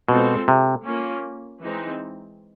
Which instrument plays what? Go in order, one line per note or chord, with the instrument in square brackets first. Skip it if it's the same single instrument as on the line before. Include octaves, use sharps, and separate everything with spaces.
[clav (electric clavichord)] B2 [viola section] G#3 C4 F4 A4 C5
[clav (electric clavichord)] C3
[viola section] A#3 C#4 F4
E3 G#3 C4 D#4